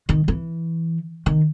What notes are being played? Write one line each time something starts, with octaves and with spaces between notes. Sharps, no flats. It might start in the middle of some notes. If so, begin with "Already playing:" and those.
D#3
E3
D#3